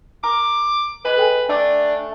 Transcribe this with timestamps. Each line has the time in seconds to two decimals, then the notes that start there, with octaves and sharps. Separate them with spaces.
0.24 A#4 D6
1.05 G#3 B4
1.17 A4 G5 G#5
1.49 A3 D4 D5